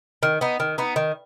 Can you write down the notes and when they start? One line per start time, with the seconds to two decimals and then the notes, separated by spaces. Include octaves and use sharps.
0.23 D#3
0.41 B3 D#4
0.60 D#3
0.78 B3 D#4
0.96 D#3